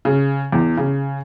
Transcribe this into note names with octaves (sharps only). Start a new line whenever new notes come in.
C#3
E2
C#3